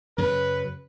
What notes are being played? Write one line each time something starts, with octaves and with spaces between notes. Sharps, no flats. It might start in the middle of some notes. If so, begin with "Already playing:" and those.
F#2 C#3 F#3 B4